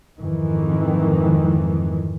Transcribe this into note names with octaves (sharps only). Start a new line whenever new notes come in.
F2 G#2 D#3 E3